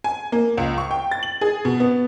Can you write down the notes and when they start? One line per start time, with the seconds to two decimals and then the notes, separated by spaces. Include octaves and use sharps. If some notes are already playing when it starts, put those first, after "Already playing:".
0.04 G#5
0.32 A#3
0.58 C#2
0.78 C#6
0.91 G5
1.11 A6
1.23 F#7
1.41 G#4
1.65 B2
1.80 B3